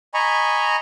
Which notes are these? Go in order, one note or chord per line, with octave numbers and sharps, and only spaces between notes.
D#5 G#5 A#5 B5 C#6